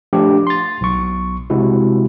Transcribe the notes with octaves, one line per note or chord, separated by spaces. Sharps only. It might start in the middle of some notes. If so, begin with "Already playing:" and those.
F3 A3 D4 G4
C6 A6
B1 C#6
C3 G#3 E4 F#4